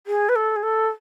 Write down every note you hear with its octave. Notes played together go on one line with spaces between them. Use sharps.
G#4
B4
A4
G#4
A4